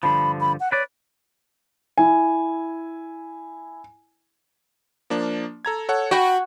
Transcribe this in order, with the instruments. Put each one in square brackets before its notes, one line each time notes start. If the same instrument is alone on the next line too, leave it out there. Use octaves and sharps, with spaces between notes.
[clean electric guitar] G2 D3 F3 [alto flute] B5
[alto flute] B5
F#5
[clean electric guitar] B4 D5 [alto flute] C#5
[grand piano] E4 G#5
[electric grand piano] F3 A#3 D4
A4 A#5 G#6
A4 C#5 F#5
[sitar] F#4 [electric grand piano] G5 B5